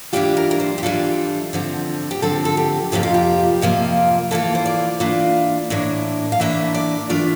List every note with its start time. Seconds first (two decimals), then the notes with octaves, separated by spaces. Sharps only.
0.13 E3 G3 D4 F4 G4
0.37 A#4
0.51 A#4
0.60 C5
0.78 G4
0.83 E3 G3 D4 F4 A4
1.53 D3 F3 C4
2.11 G4
2.22 D3 F3 C4 A4
2.45 A4
2.57 G4
2.92 F2 C3 F3 A#3 F4 G4
3.03 F4
3.14 G4
3.61 F2 C3 F3 A#3 F4
4.31 E3 A#3 D4 F4 A4
4.55 C5
4.66 D5
5.00 E3 A#3 D4 F4
5.70 A2 E3 A#3 D4
6.32 F5
6.40 A2 E3 A#3 D4 E5
6.74 D5
7.09 E3 A3 D4 F4 D5